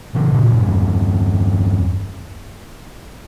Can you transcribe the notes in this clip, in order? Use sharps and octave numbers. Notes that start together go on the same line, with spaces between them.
C#3 E3
A#2 C#3
A#2
E2 G2